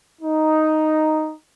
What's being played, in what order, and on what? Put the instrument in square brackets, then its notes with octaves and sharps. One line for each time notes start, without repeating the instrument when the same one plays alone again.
[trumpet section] D#4